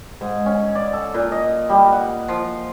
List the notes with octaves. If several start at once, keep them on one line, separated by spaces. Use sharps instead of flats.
G#2
C#4
D5
A4
A#2
D#5
G3
F#5
F3